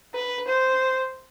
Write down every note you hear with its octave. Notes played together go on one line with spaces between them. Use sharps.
B4
C5